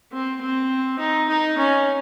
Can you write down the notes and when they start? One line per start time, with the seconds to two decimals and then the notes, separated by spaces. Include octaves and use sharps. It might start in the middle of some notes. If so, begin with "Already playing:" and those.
0.12 C4
0.41 C4
0.99 D#4
1.29 D#4
1.58 C#4